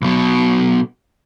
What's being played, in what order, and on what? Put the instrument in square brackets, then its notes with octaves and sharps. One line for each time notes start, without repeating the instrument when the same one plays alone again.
[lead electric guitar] B1 B2